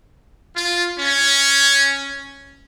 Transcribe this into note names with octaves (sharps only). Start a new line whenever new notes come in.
F4
C#4